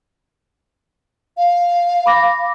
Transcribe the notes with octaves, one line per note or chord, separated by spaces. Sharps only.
F5
B5 D6 A#6